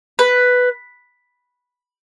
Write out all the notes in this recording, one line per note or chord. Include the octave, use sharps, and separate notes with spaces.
B4